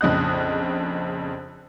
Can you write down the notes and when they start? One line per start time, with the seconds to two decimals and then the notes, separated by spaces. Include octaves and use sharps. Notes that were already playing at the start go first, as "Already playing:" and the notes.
0.01 A#1 F2 C#3 D#5 D#6 F#6